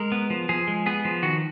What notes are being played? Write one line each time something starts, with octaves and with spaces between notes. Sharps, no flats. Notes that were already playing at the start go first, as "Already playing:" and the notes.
Already playing: G#3 A#4
B3
F3
F3 G#4
G#3
B3 G#4
F3
D#3 F#4